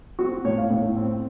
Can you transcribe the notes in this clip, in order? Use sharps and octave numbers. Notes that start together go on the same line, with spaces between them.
C4 F#4
A2 C#5
F5
A2
C4